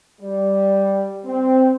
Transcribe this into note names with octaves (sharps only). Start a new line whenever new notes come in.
G3
C4